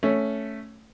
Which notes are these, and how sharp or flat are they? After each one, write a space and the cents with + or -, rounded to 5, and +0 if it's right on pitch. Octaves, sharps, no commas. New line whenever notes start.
A3 +0 C#4 +0